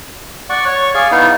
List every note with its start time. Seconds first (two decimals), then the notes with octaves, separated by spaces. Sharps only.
0.50 D5 F#5 C#6
0.66 C#5 C#6
0.94 G#4 D5 F5 C#6
1.12 B3 D#4 E4 F5